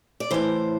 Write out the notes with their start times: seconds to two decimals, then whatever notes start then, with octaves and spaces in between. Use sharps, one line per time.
0.20 D5
0.31 A2 E3 C5